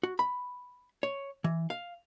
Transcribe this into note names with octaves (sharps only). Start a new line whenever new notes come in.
F#4
B5
C#5
E3
F5